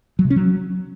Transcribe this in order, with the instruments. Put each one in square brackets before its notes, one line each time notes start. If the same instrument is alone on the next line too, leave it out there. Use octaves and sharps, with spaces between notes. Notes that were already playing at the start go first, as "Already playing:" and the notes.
[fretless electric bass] F#3
C3
C#4
F#3